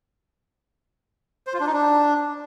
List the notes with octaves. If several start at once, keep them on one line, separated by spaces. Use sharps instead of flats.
C5
F4
D4
D#4
D4